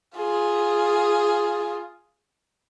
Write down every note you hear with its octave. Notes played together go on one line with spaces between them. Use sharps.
F4 G#4